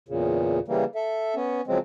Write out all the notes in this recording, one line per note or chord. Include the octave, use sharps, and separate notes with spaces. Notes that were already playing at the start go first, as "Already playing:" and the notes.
E2 A#2 C#3
C#3 E3 G3 A#3
A4 E5
B3 C#4
C#3 F3 F#3 G#3 C4